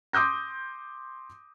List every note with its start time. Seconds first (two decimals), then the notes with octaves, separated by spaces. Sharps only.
0.13 C6 D6 D#6 G6 A#6